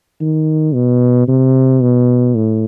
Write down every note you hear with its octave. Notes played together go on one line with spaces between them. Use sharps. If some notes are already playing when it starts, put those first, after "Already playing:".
D#3
B2
C3
B2
A2